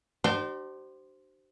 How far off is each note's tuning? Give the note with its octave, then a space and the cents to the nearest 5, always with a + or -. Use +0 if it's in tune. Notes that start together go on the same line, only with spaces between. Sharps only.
D4 +40 G4 -40 C5 +0